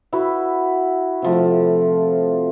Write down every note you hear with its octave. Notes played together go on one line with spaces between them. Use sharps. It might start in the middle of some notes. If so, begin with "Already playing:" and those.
E4 F#4 B4
C3 F3 A3